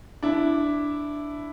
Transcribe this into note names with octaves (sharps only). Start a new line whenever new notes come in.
D4 E4